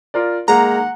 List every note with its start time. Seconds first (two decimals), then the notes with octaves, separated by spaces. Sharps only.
0.14 F4 A#4 D5
0.48 G#3 A#3 F#5 A#5